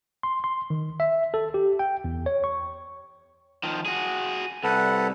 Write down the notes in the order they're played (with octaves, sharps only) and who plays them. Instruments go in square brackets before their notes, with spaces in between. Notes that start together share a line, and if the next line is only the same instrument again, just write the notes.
[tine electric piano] C6
C6
D#3
E5
A4
G4
G5
E2
C#5
C#6
[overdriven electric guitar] D#3 F3
F#4 G#4
[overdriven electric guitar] C2 [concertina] A4 B4 F#5